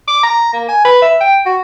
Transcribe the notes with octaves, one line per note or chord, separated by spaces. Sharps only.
D6
A#5
A#3
G#5
B4
E5
G5
F#4